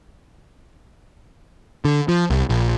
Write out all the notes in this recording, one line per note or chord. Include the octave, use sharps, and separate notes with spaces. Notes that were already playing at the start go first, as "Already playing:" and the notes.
D3
F3
C2
A#1